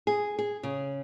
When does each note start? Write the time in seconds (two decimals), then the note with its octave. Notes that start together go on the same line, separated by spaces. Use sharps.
0.07 G#4
0.39 G#4
0.63 C#3